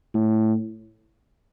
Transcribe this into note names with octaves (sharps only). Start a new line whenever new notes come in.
A2